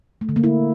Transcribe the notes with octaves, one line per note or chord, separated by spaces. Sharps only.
A3
D3
A#3
E4